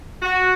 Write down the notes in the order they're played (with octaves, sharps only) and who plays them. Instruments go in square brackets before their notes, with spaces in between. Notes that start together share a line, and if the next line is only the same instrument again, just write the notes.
[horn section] F#4